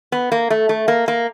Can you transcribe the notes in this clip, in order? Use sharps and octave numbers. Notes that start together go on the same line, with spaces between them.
B3
A#3
A3
A3
A#3
A#3